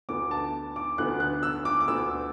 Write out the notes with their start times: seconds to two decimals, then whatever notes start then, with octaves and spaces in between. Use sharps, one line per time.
0.09 D2 D3 B3 D6
0.31 A5
0.76 D6
0.98 D2 D3 B3 F#6
1.20 F#6
1.43 E6
1.65 D6
1.80 D6
1.88 D2 D3 B3 E6